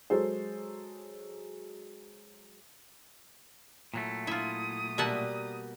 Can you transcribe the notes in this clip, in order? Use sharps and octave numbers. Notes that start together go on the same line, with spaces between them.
F#3 G#3 A4 C5
A#2 F#3 A3 E4
E4 F4 E5 D#6
B2 G3 A#3 E5 F#5 A5